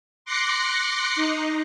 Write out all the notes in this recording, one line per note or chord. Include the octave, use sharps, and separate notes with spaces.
C6 D6 F#6 A#6 C7 C#7
D#4